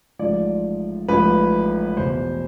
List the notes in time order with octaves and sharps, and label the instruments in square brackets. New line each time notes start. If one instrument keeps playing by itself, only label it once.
[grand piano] A1 G#2 F3 D5
A1 G#2 F3 B4
E2 B2 C5